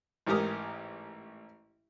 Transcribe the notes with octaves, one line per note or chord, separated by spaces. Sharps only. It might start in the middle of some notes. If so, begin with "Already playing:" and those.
A1 G#2 G4 A#4 D#6